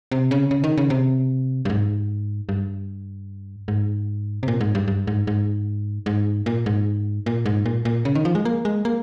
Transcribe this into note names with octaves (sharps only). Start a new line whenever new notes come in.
C3
C#3
C#3
D#3
C#3
C3
G2
G#2
G2
G#2
C3
A#2
G#2
G2
G2
G#2
G#2
G#2
A#2
G#2
A#2
G#2
A#2
A#2
C#3
D#3
F3
G#3
A#3
G#3
A#3